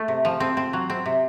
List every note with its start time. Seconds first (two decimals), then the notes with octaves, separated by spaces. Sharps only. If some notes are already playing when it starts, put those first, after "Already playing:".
Already playing: A3
0.08 C3
0.25 F3
0.40 C4
0.57 C4
0.73 F#3
0.90 C4
1.06 C3